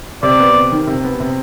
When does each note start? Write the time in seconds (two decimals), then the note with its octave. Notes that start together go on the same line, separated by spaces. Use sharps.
0.23 C3 D5
0.40 B3
0.56 C3
0.72 D#3
0.87 C3
1.04 B3
1.20 C3